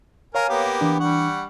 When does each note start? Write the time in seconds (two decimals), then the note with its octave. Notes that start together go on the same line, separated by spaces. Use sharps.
0.35 A#4 C#5 F5 G#5 A#5
0.49 A#3 B3 G4
0.81 E3 D4
1.00 G3 F#5 C#6